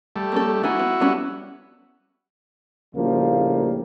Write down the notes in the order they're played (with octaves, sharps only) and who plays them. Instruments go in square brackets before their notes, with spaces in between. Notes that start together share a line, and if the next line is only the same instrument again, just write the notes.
[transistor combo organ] G3 A3
[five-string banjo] A#3 C#4 A4
[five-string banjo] B3 D#4 G#5 [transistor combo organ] E4 F#4
[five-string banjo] B3
G3 B3 C#4
[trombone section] A#1 A2 C#3 F3 G3 A#3